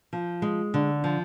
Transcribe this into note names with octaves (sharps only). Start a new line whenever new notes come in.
F3
G#3
D3
F3